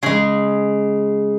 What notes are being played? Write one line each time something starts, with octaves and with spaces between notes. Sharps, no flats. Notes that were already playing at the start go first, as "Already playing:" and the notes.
C#3 G#3 G#4